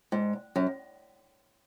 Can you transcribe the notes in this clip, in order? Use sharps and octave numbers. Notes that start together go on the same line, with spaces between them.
G#2
F#2